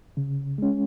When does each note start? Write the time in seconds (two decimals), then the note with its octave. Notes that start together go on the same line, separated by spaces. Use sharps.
0.17 C#3
0.58 G#3 C#4